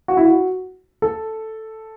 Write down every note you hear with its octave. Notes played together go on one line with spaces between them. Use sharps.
F#4
E4
F#4
A4